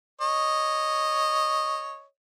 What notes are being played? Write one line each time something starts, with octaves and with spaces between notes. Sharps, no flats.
C#5 D#5